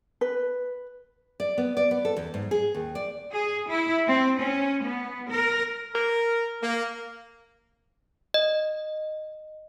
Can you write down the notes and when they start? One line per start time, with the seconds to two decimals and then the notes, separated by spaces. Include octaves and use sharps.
0.21 B4
1.40 D5
1.58 B3
1.77 D5
1.91 B3
2.05 A4
2.16 E2
2.34 G#2
2.51 G#4
2.75 D#2
2.95 D5
3.32 G#4
3.69 E4
4.07 C4
4.40 C#4
4.82 B3
5.29 A#4
5.94 A#4
6.63 A#3
8.34 D#5